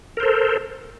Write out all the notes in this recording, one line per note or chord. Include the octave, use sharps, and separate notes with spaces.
A4 A#4 C5